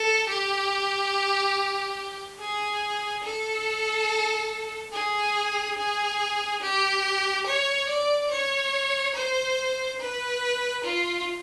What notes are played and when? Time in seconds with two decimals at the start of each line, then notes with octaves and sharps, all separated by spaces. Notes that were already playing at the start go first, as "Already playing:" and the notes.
Already playing: A4
0.29 G4
2.39 G#4
3.24 A4
4.93 G#4
5.78 G#4
6.62 G4
7.47 C#5
7.89 D5
8.31 C#5
9.15 C5
10.00 B4
10.84 F4